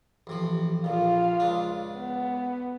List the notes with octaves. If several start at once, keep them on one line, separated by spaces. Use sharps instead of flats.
A1 C3 F3
A#1 A#2 F4 F5
C#2 D4
B3